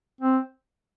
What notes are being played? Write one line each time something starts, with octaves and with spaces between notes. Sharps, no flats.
C4